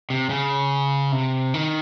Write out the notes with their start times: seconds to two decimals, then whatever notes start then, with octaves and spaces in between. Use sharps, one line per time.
0.10 C3
0.30 C#3
1.12 C3
1.54 D#3